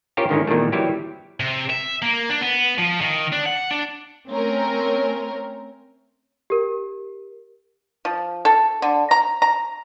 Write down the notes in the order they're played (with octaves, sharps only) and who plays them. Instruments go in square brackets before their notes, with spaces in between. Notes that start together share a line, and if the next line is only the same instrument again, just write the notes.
[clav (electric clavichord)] C#4 F4 G4 A#4 C5 C#5
G#2 D3 D#3 C#4 D#4 E4
E2 A#2 D#3 G3 A3
E3 F#3 G3 E4 G4
[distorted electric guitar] C3
E5
A#3
D4
B3
F3
D#3
D4
F#5
D4
[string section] A3 C4 C#4 A#4
[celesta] G4 A#4
[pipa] F3
A4
D3
A#5
A#5